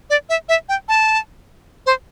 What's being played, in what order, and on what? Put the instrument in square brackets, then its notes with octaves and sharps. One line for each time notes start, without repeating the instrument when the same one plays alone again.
[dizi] D5
E5
E5
G5
A5
C5